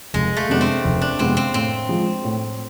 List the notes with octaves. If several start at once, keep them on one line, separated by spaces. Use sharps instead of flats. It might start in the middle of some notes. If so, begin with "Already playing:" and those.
F1 G#3
A3
F2 C3 G#3 B3 D4
C4
F1
D4
F2 C3 G#3 B3 C4
C4
A2 C4
F3 G#3
A2